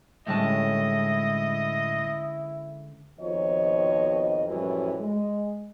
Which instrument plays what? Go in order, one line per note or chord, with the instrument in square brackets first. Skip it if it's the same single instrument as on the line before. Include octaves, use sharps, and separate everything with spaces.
[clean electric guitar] A2 G3 A5 [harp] D3 G#3 C#4 [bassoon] E4 [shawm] D#5
[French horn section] F2 B2 D#3 F3 C#5 D#5
F#2 A2 E3 F3 G3 C#4
G#3